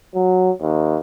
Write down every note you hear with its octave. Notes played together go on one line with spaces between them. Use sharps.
F#3
D#2